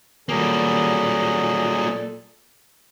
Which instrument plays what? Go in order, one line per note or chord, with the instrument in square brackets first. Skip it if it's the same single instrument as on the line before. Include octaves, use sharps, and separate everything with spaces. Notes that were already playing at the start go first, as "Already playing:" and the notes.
[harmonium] A#2 A4 [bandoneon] F#3 G#4 [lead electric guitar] G3 A#3